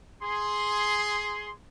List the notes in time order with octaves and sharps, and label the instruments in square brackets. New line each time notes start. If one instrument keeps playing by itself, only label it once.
[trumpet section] G#4 C6